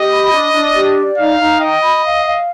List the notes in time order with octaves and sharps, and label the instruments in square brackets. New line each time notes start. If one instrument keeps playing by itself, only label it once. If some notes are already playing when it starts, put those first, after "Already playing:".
Already playing: [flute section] G4 [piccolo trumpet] D#5
[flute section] B5
D4
D4
G4
D5
[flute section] D#4 [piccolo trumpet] F5
[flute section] D#4
[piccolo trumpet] D#5 [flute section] G5
[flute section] B5
F5
F5